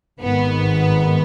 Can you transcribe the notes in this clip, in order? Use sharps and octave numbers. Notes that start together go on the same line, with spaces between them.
G#1 G#2 D#3 B3